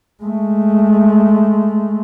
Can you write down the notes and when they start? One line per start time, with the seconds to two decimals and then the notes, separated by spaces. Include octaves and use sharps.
0.23 G#3 A3